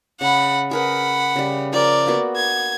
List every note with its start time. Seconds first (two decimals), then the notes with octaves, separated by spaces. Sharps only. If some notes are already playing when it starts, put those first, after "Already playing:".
0.21 C#3 F#5 B5
0.71 G#4 A#4 B4 F#5 B5
1.36 C#3 G3
1.73 F3 A#4 D5
2.07 A#3 B3 F#4
2.37 G#6